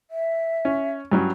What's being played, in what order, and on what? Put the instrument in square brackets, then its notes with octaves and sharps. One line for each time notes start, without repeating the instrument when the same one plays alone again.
[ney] E5
[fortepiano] C#4
G2 F#3 C#4